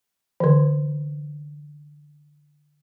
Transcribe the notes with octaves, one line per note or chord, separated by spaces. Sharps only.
D3 E3